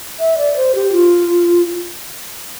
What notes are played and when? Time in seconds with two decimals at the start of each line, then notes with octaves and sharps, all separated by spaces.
0.20 E5
0.38 D5
0.56 C5
0.75 G4
0.92 F4